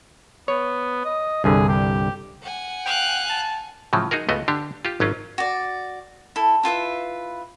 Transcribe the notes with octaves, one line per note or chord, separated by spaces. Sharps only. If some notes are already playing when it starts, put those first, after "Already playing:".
B3 C#5
D#5
C2 G2 D3 G#4
G4
F#5 G#5
F5 G5 F#6
A5
A2 C#3 F3 F#3
D#4 F#4 G#4 A#4
C#2 A3 B3 F#4 D#5
D3 D4 G4
F4 G4
G#1 F#3 C#4 F4
F#4 D5
E4 A4
E4 F4 B4 E5